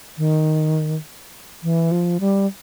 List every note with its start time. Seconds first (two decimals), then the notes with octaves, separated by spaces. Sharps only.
0.18 D#3
1.63 E3
1.91 F3
2.20 G3